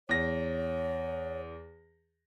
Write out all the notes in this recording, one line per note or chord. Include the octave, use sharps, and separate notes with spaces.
E2 C#5 A#6